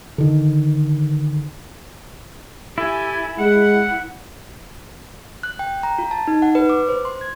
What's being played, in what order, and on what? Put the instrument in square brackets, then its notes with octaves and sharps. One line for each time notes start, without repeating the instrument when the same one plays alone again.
[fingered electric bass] D3 D#3
[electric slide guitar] E4 [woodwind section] G4 A4 G#5
[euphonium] G#3 [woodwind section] F#5
[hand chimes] F#6
G5
A#5
F4
A5
D#4
F#5
B4
D6
C5
C6
G#6